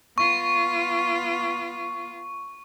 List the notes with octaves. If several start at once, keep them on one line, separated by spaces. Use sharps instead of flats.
B3 F4 C#6